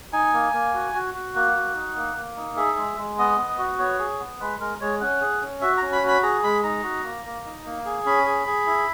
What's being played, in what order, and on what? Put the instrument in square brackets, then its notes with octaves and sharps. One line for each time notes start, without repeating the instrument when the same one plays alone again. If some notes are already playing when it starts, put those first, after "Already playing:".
[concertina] D#4 G#5
A#3
A#3
F#4
F#4
F#4
A#3 F#5
F#4
D#4
A#3
A#3
D#4
G#4 E5
G#3
G#3
B3 D#5
B3
F#4
B3 C#5
G#4
B3
G#3 B4
G#3 A#4
G#3 C#5
C#4 F#5
G#4
C#4
F#4 E5
C#4 A#5
B5
F#4
B5
G#4 A#5
G#3 B5
D#4 A#5
F#4
A#3
A#3
D#4
A#3
G#4
C#4 B5
G#4
G#4
E4